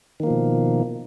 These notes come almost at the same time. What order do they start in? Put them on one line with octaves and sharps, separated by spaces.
D#3 A#3 F3 B2